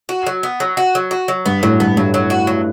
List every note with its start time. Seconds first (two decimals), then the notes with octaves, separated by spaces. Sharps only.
0.09 F#4
0.26 F#3
0.43 B3
0.60 F#3
0.77 F#4
0.95 F#3
1.11 F#4
1.28 F#3
1.46 G2 B3
1.63 A2 F#3
1.80 G2 B3
1.97 G2 F#3
2.14 F#3
2.30 F#4
2.47 F#3